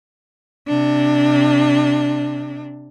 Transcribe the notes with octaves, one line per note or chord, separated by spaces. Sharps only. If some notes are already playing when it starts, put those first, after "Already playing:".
C3 D4